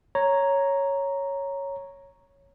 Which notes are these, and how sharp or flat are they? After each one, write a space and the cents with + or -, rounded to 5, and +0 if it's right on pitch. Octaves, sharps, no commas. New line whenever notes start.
C#5 +0 A#5 +0